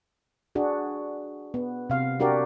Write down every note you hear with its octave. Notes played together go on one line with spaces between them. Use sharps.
D4 F#4 G#4
B3
C3 F5
D4 F#4 G4 A#4 D5